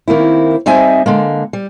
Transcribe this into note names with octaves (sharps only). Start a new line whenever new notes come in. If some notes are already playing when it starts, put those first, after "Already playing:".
D#3 A#3 C4 E4
G3 C4 D#4 D#5 E5 G#5
D3 G#3 A#3
G3